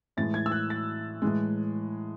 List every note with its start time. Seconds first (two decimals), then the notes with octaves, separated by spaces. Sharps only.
0.17 A2 E3 G#3 A6
0.34 G#6
0.46 E6
0.52 F#6
0.70 A6
1.22 A2 E3 G#3